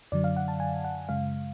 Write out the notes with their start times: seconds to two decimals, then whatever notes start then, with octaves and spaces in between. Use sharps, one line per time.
0.12 F#2 D3 F#3 D5
0.24 F5
0.37 F#5
0.48 A5
0.60 G#5
0.84 F#5
1.09 F#2 C#3 G#3 F5